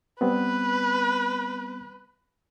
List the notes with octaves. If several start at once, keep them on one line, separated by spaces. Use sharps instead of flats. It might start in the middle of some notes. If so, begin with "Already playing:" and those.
G3 B3 C4 B4